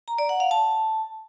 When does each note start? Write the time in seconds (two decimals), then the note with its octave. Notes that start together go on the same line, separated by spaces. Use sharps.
0.08 A#5
0.18 D5
0.29 F#5
0.40 F5
0.51 A5